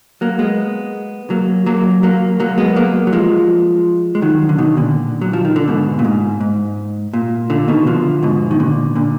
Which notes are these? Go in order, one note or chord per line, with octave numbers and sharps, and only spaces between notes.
F#3 A#3
G#3 B3
F#3 A#3
F#3 A#3
F#3 A#3
F#3 A#3
G#3 B3
F#3 A#3
F#3
F3 G#3
G#3
D#3 F#3
D3
B2 D#3
A#2 D3
F#3
F3
D#3
D3
G#2 B2
A#2
G#2
G#2
A#2
A#2 D3
B2 D#3
D3 F3
G#2 B2
D#3
A#2 D3
A#2 D3